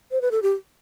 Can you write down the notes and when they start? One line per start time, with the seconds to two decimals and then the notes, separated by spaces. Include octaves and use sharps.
0.11 C5
0.22 B4
0.31 A4
0.43 G4